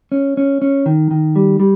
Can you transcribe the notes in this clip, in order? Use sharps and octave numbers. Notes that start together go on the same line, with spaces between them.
C#4
C#4
C#4
D#3
D#3
G3
G3